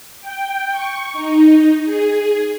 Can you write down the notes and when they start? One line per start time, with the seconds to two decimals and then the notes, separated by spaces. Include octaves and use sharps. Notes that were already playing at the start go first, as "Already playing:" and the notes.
0.21 G5
0.72 C#6
1.13 D#4
1.85 G#4